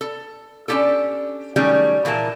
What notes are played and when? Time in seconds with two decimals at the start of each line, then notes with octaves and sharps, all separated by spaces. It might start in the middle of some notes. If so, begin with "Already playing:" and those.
0.01 A4
0.68 C#4 D4 F4 G4 A4
1.56 D#3 F#3 G3 A3 C#4 G#4
2.05 A#2 E3 A#3 A#4 A5